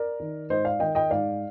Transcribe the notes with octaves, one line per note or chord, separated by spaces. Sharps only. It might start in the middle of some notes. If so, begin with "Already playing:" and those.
Already playing: A#4 D5
D#3
G#2 C5 D#5
D5 F5
D#3 D#5 G5
D#5 G5
G#2 D5 F5